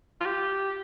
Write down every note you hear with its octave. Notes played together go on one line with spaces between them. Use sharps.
F4
G4